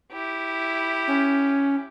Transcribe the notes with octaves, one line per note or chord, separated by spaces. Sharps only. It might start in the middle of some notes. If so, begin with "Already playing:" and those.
E4 G4
C#4